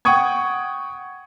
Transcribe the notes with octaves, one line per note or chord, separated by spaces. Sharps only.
F#5 G5 C#6 D#6 G#6